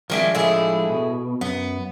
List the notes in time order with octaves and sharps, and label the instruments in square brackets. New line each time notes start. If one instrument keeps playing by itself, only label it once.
[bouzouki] D#3 G3 E4 [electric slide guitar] F3 G#3 D4
[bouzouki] A2 E4 G#4
[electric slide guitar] B2
[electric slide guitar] F#2 [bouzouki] B3